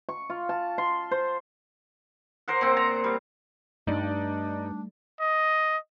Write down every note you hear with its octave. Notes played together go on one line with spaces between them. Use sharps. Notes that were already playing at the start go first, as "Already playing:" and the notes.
C#6
F4
A5
C6
C5
A#4 C5 F#5
A#2 C4
A#5
G3
G2 G3 A3 D4 D#4 D5
D#5